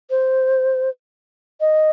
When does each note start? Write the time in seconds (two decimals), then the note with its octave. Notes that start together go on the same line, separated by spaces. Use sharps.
0.10 C5
1.60 D#5